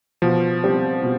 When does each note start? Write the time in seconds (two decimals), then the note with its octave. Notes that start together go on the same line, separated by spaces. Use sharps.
0.22 B2 F3
0.64 G3 C4 G4
1.03 B2